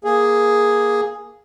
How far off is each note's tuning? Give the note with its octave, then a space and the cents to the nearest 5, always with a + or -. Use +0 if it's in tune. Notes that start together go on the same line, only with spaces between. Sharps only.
A#3 +5 G#4 +0